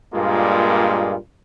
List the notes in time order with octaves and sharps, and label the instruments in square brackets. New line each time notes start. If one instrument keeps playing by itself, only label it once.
[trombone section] G2 A#2 G#3 A#3 F4